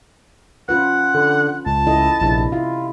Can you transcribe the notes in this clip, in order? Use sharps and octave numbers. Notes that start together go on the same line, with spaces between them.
C#4 F4 B4 F#5
D3
C#2 A5
E4 A4 D#5
A#1 C3 E4
E4 F4